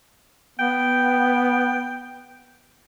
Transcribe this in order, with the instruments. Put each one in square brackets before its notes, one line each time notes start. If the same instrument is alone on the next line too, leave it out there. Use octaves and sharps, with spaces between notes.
[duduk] B3 [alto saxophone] G5